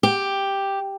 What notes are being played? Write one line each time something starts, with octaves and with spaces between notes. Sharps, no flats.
G4